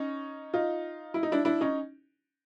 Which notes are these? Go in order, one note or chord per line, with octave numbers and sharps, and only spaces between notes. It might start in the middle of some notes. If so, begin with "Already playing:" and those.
Already playing: C#4 D#4
D#4 F4
E4
D#4
D4 E4
D4 E4
C#4 D#4